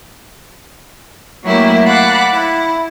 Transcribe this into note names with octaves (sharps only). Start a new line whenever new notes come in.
F#3 A3 A#3 E4 G4
F5 F#5 A5 B5 D6 F#6
E4